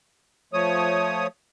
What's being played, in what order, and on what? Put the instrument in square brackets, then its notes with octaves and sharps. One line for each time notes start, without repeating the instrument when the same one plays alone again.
[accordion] F3 A3 C#5 D#6